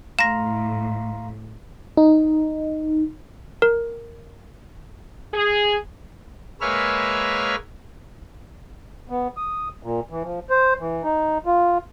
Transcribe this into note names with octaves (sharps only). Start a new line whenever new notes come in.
A2 F5 A#5 C6 A#6 E7
D#4
A#4
G#4
G#3 A#3 B4 C#5 E5 F6
B3
D#6
A#2
E3
F3
C5
E3
D#4
F4